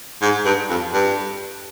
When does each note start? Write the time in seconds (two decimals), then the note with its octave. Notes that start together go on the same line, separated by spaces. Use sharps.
0.22 G#2
0.45 G2
0.70 F2
0.93 G2